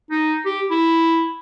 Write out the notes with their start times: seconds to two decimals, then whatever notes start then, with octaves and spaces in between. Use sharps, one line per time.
0.11 D#4
0.45 G4
0.71 E4